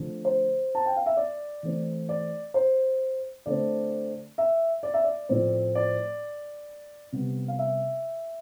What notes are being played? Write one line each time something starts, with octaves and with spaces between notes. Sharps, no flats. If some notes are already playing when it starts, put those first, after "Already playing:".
Already playing: D3 F3 A3 C4
C5
A5
G5
F5
E5
D5
E3 A3 C4
D5
C5
D3 A3 C4 D5
E5
D5
E5
D5
A2 F3 C4
D5
C3 G3 B3
F5
E5